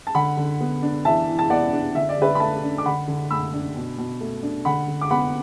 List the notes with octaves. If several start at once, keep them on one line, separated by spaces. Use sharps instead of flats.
A5
D3 F#5 B5
D3
B3
D4
E3 E5 A5
E3
A5
B3 D5 F#5
D4
D3 E5
D5
D3 B4 E5
B5
A3 E5 A5
D4
D6
D3 F#5 B5
D3
A3 B5 E6
D4
B2
B2
A3
D4
D3 F#5 B5
D3
D6
B3 F#5 B5